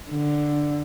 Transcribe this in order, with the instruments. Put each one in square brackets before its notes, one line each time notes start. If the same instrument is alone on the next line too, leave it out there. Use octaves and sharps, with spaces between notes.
[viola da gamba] D3